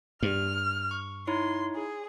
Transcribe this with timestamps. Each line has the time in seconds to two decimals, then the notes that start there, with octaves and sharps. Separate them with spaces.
0.23 G2 F6
0.91 C#6
1.27 D#4 E4 C#5 C6
1.75 G#4